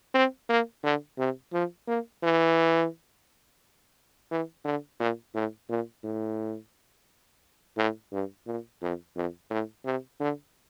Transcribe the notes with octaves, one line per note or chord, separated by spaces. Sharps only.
C4
A#3
D3
C3
F3
A#3
E3
E3
D3
A#2
A2
A#2
A2
A2
G2
A#2
F2
F2
A2
C3
D3